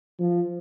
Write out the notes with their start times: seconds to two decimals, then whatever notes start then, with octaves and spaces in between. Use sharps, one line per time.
0.19 F3